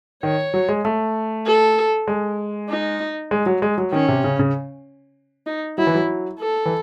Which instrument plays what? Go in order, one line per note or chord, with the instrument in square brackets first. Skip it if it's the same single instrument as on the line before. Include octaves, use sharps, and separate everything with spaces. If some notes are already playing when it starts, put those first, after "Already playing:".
[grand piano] D#3 [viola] C#5
[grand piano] F#3
G#3
A3
[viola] A4
[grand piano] G#3
[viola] D#4
[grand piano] G#3
F#3
G#3
F#3
[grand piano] D#3 [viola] C#4
[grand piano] C3
C#3
C#3
[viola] D#4
[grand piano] F#3 [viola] E4
[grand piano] E3
F#3
[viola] A4
[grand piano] E3